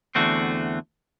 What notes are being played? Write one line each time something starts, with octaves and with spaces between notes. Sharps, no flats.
E2 D3 A3 C4 F#4